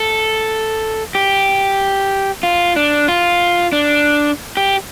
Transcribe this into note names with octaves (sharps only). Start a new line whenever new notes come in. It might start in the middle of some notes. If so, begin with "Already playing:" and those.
Already playing: A4
G4
F4
D4
F4
D4
G4